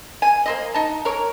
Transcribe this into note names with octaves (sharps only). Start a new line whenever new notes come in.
G#5
A#3 C5 D#5
D#4 A5
A#4 C#5